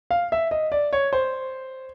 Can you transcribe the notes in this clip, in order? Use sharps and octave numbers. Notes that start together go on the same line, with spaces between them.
F5
E5
D#5
D5
C#5
C5